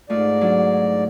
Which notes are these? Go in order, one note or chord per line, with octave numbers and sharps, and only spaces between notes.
G#2 A3 D#4 F4 D5
F#3 D4 F4